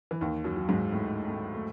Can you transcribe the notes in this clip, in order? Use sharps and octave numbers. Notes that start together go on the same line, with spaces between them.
E3
D#2 D#3
F#2 F#3
F#3
G#2 G#3
A2 A3
A2 A3
A3